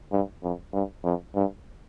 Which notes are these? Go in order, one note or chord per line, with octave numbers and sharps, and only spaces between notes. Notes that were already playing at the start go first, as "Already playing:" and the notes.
G2
F2
G2
F2
G2